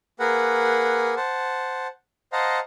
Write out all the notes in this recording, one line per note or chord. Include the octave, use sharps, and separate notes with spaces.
A#3 G#4 A#4 B4 F#5
C5 F#5 A5
C5 D#5 F5 F#5 A5 A#5